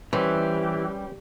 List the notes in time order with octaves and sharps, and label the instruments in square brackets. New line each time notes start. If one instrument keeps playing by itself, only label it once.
[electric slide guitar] E3 [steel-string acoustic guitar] G3 [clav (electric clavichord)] C#4 B4 C5 [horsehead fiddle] G4